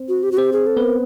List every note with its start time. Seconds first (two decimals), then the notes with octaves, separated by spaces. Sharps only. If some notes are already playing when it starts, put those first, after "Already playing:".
Already playing: C4 C5
0.09 F#4
0.23 G4
0.32 F#4
0.37 C4 G4 C5
0.53 G#4
0.67 A4
0.77 B3 B4
0.82 A#4